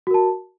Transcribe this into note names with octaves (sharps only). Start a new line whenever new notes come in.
F#4 A#4 A5